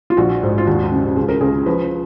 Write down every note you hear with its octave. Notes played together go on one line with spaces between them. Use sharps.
F4
A#1 F#4
G#2
F4
D#2 F#4
C#3
C#2 G#4
A#4
C#2 G#4
F3 B4